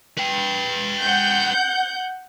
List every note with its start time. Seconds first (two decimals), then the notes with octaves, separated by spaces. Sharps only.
0.17 B4 G5
1.02 F#5 G6